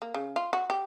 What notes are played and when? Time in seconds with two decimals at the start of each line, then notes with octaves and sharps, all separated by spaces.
0.02 A#3
0.14 C#3
0.36 F4
0.53 F#4
0.70 G4